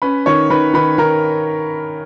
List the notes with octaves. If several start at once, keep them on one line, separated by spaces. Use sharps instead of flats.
C#4 B4 B5
D#3 C#5 C#6
D#3 B4 B5
D#3 B4 B5
D#3 A#4 A#5